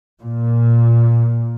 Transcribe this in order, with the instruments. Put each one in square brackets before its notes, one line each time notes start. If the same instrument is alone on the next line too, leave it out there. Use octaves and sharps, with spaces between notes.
[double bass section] A#2